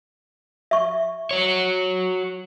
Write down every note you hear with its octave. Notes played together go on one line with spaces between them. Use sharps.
E5 C#6
F#4 C#5